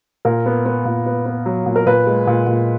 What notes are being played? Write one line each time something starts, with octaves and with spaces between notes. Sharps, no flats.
A#2 A#4
B3
B3
A#2
B3
B3
F#3
A#2
A#4
A#2 B4
G#3
A#2
A#2